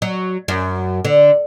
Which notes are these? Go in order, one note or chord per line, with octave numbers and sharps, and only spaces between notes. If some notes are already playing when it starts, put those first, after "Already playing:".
F#3
F#2
D3